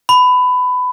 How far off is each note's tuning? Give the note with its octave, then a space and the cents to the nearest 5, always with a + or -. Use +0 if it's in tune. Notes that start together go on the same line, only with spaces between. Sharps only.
B5 +20